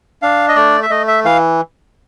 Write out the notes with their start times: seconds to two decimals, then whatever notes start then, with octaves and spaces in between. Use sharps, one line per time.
0.22 D4 F5
0.49 D#5
0.56 A3 D5
0.83 E5
0.90 A3 D#5
1.08 E5
1.25 E3 F5